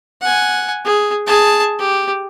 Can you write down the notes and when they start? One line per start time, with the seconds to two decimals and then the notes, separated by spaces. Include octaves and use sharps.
0.21 F#5 G#5
0.85 G#4
1.26 G#4 A5
1.79 G4